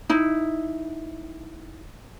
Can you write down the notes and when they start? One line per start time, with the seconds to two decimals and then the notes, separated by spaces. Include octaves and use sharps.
0.09 D#4 E4